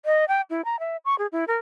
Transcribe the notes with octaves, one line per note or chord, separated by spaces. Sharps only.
D#5
G5
E4
A#5
E5
C#6
G#4
E4
A#4